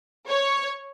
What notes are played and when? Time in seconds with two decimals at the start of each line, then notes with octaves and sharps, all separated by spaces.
0.28 C#5